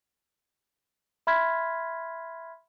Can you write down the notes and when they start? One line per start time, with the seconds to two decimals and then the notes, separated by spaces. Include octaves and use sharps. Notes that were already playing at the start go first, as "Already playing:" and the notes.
1.27 E5 B5 C6 F6 G#6 B6